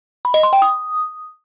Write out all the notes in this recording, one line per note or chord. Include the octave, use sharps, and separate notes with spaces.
B5
D#5
C6
G5
D#6